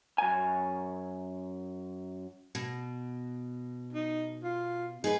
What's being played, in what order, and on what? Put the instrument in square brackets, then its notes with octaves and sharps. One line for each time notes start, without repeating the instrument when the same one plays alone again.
[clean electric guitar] F#2 G#5
[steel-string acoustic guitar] B2
[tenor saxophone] D#4
F4
[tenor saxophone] D#4 [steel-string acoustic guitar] G#4 B4